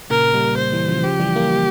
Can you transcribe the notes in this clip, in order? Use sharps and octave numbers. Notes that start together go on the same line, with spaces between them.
A#2 C#3 A#4
G3 A#3
C5
E3 G3
C#3 F3
C#3 F3 G4
E3 G3
G3 A#3